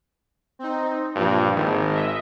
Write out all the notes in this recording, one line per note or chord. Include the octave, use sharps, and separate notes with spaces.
C4 D#4
G2 A#2 F3
G#1 D#3 G#3
D#5 E5